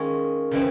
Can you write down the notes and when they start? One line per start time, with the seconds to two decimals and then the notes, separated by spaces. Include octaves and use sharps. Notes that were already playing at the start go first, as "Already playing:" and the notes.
Already playing: D#3 G#3 C#4 F4 G#4
0.51 C#3 E3 G#3 C4